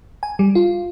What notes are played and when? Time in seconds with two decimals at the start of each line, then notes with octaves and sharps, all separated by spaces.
0.23 G#5
0.39 G3
0.55 F4